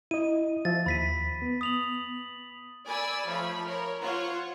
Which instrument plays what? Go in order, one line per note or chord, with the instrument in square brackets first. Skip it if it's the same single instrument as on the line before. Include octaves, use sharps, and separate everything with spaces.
[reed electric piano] E4 D#5 [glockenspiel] D#7
[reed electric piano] F3 F4 E5 [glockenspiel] A6
[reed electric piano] D#2 [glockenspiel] B5 B6 D#7
[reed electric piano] B3
[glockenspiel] D#6 F7 F#7
[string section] D5 G#5 B5 E6
F3 A3 C#5 B5
A#4 C#5
F4 C5 C#5 F#5 C#6